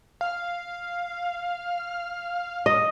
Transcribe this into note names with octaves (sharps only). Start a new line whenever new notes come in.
F5
D#5